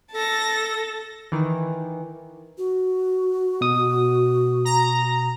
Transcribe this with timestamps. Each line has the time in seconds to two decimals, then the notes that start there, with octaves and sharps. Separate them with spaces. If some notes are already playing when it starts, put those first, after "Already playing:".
0.13 A4 A5 A#6
1.32 D#3 E3
2.58 F#4
3.61 B2 D#6
4.65 A#5